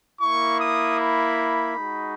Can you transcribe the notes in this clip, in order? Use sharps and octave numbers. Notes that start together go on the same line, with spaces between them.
A#3 E4 C#6
D#6
B5
G#3 D#4 F#4